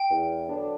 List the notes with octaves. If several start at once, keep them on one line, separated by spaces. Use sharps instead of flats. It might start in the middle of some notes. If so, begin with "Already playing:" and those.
Already playing: G5
E2
D3 F#3 B3 D4